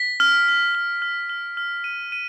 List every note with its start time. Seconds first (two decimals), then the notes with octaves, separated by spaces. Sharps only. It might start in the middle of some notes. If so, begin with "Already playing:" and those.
Already playing: B6
0.20 F6
0.48 F6
0.75 F6
1.02 F6
1.29 F6
1.57 F6
1.84 D#7
2.12 D#7